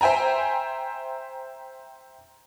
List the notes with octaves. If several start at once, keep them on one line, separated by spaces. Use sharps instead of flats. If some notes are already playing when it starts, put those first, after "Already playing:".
C5 E5 G5 G#5 A#5